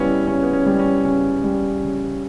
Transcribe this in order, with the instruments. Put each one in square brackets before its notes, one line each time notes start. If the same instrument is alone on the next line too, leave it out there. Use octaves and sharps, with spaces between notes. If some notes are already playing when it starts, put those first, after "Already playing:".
Already playing: [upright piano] C#3 G3 B3 C#4 E4
C#3 C#4
B3
C#4
G3
C#4
C#3 C#4
G3
C#3